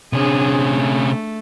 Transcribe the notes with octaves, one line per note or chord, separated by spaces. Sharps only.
C3 C#4 D4 G#4
A3